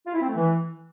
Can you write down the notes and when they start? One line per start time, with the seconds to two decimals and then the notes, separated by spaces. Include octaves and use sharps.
0.07 F4
0.14 E4
0.21 C4
0.28 A3
0.35 E3